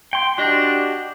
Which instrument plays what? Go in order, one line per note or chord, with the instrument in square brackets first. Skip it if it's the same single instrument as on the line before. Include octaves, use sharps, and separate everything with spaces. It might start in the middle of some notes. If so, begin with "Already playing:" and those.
[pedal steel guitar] G5 C6
[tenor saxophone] D4 [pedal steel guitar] F#4 G4 D#5